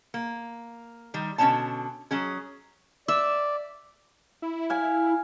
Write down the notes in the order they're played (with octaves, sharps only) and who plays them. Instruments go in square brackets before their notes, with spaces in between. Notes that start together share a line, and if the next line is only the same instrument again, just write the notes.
[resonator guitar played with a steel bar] A#3
D#3 G3
B2 D3 C#4 D#4 C#5 A5
F#3 C#4 G#4
[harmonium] D5 [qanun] E5
[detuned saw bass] E4
[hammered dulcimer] F5 G#5